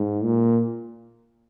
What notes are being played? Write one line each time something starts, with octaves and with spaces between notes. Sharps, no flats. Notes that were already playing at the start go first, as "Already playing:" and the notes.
Already playing: G#2
A#2